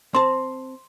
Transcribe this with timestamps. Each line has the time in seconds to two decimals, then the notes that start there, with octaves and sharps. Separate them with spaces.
0.14 C4 A5 C6